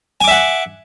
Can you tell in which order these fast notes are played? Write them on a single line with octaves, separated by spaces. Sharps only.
G#5 D6 E5 F#5